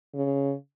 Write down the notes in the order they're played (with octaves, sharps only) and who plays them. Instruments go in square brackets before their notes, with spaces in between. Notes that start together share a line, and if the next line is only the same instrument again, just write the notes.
[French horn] C#3